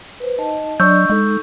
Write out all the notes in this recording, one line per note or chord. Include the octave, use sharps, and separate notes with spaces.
B4 C5
D#4 D#5 A5
F#3 D4 D5 D#5 C#6 E6 G6
G#3 D#4 A4